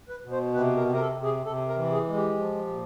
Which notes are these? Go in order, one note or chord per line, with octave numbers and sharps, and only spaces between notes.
B4
B2
C5
C3 B4
A#4
C3
A#4
A4
C3
G#4
C3 A4
A#4
E3
G#4
G#3
G4
F3
A#2